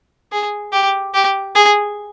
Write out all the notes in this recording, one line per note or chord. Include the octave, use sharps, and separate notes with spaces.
G#4
G4
G4
G#4